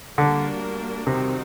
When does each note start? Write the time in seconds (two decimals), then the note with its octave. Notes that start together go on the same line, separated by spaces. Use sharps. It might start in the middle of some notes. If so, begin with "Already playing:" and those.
0.18 D3 G3 A#3 D4 F#4 A#4
1.06 C3 D#3 G3 C4 D#4 F#4